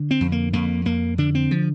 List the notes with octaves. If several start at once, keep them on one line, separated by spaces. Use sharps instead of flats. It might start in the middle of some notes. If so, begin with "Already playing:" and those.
Already playing: D3
C4
F2
A#3
F2 A#3
F2 A#3
D3 D4
C4
F3